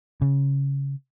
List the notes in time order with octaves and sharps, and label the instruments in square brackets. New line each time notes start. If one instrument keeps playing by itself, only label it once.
[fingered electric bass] C#3